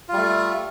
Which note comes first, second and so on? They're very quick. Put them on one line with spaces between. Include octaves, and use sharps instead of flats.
F4 G3 A3